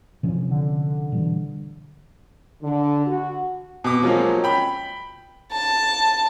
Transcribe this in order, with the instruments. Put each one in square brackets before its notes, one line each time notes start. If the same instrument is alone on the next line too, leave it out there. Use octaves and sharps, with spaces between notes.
[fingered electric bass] C3 F3 C#4
[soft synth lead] D3
[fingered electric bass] B2 E3 G3
[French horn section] D3
F#4
[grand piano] B2 D6
F3 F#3 G#3 A#3 C#4
G5 B5
[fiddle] A5